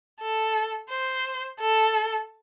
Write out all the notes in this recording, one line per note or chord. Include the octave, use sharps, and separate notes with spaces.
A4
C5
A4